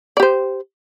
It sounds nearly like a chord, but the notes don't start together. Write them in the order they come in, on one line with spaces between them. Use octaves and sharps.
D5 G4 C5